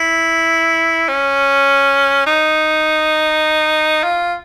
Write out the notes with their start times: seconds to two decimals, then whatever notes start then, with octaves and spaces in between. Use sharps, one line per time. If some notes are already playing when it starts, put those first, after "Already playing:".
Already playing: E4
1.08 C#4
2.26 D#4
4.04 F4